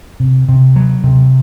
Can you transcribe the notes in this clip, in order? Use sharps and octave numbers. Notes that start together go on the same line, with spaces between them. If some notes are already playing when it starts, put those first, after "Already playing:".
C3
C3
F#3
C3